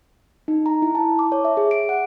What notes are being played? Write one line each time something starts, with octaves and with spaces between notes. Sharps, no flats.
D#4
A#5
E4
A5
D6
C#5
E5
G#4
D7
F#5